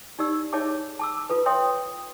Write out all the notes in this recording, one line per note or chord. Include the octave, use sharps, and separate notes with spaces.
D#4 G4 D5 E6
D#4 G#4 C#5 E5 A5 D6
A5 D6 E6
F4 A4 B4
C#5 E5 G5 C6 D#6